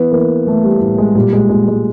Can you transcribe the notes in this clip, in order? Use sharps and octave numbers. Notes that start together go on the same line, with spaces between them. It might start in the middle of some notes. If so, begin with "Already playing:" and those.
Already playing: E3 B3
E3 A#3
E3 A3
G3
A2 G3
G#3
A#2 G3
G#3
A#2 G#3
G#3